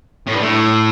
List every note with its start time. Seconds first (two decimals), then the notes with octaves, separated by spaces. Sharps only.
0.27 A2
0.34 G2
0.41 A2